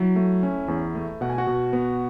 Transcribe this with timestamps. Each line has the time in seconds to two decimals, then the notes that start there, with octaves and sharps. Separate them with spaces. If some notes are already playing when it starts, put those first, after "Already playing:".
Already playing: F#3 E4
0.16 A3
0.43 C#4
0.68 E2
0.95 A3
1.21 B2 F#5
1.30 G#5
1.38 F#4 F#5
1.47 B2
1.73 B3